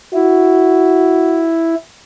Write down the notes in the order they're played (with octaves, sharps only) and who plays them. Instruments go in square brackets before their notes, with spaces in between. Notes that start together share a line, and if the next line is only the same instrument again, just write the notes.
[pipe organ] E4 [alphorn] F#4